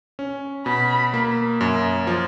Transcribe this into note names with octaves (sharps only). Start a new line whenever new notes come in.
C#4
B2 B5
A#3
F#2
F3